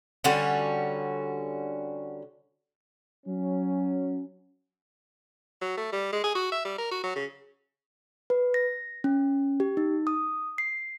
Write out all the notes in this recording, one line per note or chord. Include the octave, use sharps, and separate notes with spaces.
D3 G3 C#4 F#4
F#3 C#4
F#3
A3
G3
G#3
G#4
F#4
E5
G3
A#4
F#4
F#3
C#3
B4
A#6
C#4
G4
D#4
D#6
C7